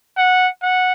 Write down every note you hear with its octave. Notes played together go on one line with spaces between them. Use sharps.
F#5
F#5